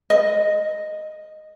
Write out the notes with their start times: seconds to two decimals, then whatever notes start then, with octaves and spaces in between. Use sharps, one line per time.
0.10 D#5